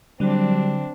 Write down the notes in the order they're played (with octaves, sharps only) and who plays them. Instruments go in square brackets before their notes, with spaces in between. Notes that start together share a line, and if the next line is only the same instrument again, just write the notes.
[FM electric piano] D3 F#3 [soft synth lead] G3 [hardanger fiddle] C4 D4